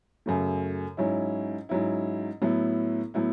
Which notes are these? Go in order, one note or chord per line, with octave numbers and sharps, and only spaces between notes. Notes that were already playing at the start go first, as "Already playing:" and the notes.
F#2 C#3 F#3 A3
G#2 F#3 C#4 E4
G#2 F#3 C#4 E4
A2 F#3 B3 E4
A2 F#3 B3 E4